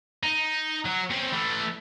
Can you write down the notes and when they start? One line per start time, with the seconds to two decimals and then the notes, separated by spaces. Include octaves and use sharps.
0.23 D#4
0.86 F#3
1.11 C4 C#4
1.33 E3 A3